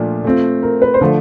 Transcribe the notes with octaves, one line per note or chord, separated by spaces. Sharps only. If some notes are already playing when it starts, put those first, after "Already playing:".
Already playing: A#2 F3 A3 D4 F4
A3 C4 F4
A#4
B4
C5
D3 F3 A3